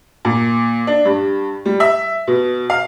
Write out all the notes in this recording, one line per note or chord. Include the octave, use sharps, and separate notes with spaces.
A#2
D4
G2
G3
E5
B2
F5